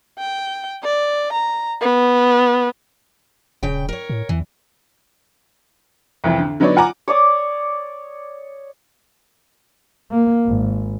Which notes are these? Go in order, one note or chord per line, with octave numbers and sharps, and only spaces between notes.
G5
D5
A#5
B3
D#1 C#3 G5
A#4 C#5
A2
E2 E3
C2 F2 E3
D3
D3 F#3 B3 D#4 C#5 D5
F4 F#5 G#5 A#5 D6
C#5 D5 D6 D#6
A#3
G#1